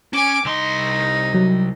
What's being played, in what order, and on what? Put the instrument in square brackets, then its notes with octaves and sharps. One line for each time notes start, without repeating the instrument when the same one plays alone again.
[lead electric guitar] C#4 [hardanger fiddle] G#5 D6
[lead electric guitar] C2 C6 [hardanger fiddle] D#4
[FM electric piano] F#3